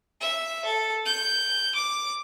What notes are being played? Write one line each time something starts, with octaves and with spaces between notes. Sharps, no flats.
E5
A4
G6
D6